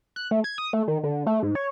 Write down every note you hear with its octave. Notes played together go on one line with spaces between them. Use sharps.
F#6
A3
G#6
D#6
A3
D#3
D3
A3
G#2
C#5